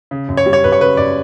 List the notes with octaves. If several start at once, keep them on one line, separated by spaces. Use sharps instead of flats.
C#3
F#2
C#5
G3
C#5
F#2 B4
C#5
C#3 B4
F#2 D5